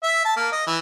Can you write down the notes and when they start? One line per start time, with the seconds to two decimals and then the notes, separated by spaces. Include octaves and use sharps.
0.03 E5
0.25 A5
0.36 A#3
0.52 D#5
0.66 E3